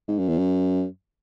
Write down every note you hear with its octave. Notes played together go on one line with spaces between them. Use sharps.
G#2
F#2
E2
F#2